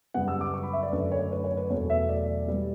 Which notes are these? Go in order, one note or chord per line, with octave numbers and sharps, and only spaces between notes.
F#2 C#3 G3 B3 F#5
E6
D6
C#6
B5
E5
D5
F#2 D3 A3 B4
C#5
B4
C#5
B4
E2 B2 F#3 A3 C#5
E5
D5
B2 G3 B3